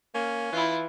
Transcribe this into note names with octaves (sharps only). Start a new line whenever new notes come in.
A#3 C#4
E3 E4 F4